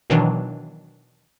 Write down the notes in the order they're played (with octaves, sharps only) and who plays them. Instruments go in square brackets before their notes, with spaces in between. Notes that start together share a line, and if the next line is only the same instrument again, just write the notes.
[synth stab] B2 D#3 E3 F#3 D4